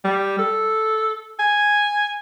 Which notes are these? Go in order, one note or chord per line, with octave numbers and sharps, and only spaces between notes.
G3
A4
G#5